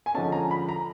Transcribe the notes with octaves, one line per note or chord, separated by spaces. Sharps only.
G#5
D3 F3 G#3 C#4 A5
A#5
B5
A#5